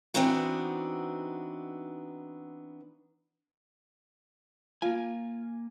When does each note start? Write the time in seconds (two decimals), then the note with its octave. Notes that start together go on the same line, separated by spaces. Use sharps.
0.14 E3 B3 C4 D4 D#4 F#4
4.82 A#3 F4 G#5